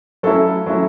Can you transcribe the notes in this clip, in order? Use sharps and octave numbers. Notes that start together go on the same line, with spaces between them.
F#3 A3 C#4 E4 A4
F#3 A3 C#4 E4